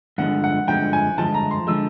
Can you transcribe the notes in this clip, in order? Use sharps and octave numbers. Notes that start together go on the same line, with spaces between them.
G2 D3 F3 G#3 F#5
F#5
G2 D3 F3 G#3 G5
G#5
G2 D3 F3 G#3 A5
A#5
C6
D3 F3 G#3 E6